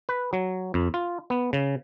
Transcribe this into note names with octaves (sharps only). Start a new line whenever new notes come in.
B4
F#3
F2
F4
B3
C#3